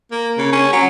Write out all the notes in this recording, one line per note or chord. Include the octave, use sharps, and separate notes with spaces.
A#3
C#3
C#4
F#3